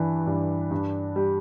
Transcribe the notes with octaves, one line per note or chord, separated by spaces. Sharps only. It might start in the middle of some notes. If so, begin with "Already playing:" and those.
Already playing: G2 E3 D4
G2
G2
G3